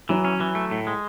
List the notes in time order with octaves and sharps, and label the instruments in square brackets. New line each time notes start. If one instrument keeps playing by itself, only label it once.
[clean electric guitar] E3 [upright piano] F#3
[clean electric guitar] C#4
E3
A3
A2
G#3